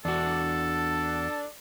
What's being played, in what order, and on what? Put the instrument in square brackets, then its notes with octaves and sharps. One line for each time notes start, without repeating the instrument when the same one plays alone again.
[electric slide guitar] E2 F#4 [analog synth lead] D4 [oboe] A4